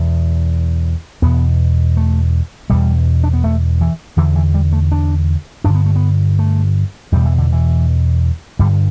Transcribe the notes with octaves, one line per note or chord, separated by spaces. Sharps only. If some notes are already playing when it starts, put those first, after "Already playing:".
Already playing: E2 B2
E2 B2 B3
A3
E2 B2 G3
D4
B3
A3
E3
E2 D3 E3
E3
G3
A3
D4
G2 D3 D4
B3
A3
B3
A3
E2 B2 G3
E3
D3
E3
G2 D3 G3